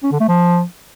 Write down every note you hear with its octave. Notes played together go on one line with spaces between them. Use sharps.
C#4
D3
A3
F3